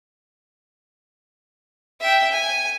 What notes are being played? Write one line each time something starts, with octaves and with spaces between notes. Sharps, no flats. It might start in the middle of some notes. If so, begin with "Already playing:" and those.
E5 G5
G#5